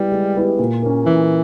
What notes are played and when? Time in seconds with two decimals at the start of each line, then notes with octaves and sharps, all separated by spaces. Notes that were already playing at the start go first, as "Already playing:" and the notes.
Already playing: G3 G#3 B3 E4 G4
0.12 G#3
0.36 B3 E4 G4
0.59 A#2
0.82 A#3 C#4
1.06 A#2 E3